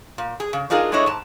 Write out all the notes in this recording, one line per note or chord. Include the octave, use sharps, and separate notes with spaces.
A#2
G#4
C#3
D4 D#4 F4 G#4 A#4
G#3 A3 D4 E4 C#5 D#5
G#2 A5